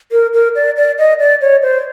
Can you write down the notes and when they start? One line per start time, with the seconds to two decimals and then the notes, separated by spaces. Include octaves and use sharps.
0.12 A#4
0.33 A#4
0.55 D5
0.76 D5
0.98 D#5
1.20 D5
1.41 C#5
1.63 C5